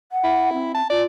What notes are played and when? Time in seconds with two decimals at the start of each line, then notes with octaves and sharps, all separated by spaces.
0.12 F#5
0.24 E4
0.53 C4
0.75 A5
0.90 F4 D5